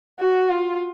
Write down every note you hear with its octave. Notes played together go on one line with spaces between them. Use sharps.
F#4
F4